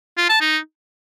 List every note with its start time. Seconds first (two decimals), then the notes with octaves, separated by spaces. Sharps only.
0.17 F4
0.29 A5
0.41 D#4